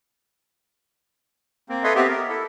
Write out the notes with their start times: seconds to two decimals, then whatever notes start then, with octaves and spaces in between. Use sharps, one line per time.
1.69 A#3 C4
1.84 A4 B4 C#5 D#5 E5 C6
1.96 B3 C4 G4 E5
2.09 A#4
2.28 E4 A4